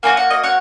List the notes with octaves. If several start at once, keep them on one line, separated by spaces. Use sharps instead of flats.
A#3 D#4 F#4 G#5
F#5
D#5
C#5 F#5